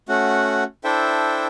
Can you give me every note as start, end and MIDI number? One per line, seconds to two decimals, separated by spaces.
0.09 0.64 57
0.09 0.64 61
0.09 0.64 66
0.09 0.64 78
0.84 1.47 62
0.84 1.47 64
0.84 1.47 69
0.84 1.47 72
0.84 1.47 76
0.84 1.47 79